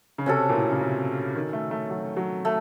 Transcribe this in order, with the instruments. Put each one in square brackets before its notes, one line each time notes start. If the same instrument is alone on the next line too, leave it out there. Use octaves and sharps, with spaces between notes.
[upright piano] C#3
[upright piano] C3 [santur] C#4 F#4 A4
[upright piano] A#2
A2
C#3
C3
D#3
A3
A3
F#3
F#3
[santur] A3